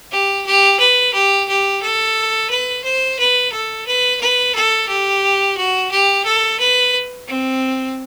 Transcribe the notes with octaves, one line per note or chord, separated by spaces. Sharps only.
G4
G4
B4
G4
G4
A4
B4
C5
B4
A4
B4
B4
A4
G4
F#4
G4
A4
B4
C4